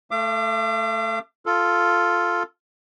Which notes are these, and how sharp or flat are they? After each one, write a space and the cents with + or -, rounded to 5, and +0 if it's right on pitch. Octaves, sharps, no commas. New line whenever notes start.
A3 +0 F5 -45 D6 +20
F4 +0 A4 +0